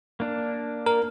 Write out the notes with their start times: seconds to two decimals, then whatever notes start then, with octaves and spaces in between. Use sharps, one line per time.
0.20 A#3 D4
0.86 A#4